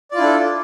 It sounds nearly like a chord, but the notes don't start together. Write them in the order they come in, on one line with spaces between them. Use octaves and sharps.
D5 F4 E4 D4 A4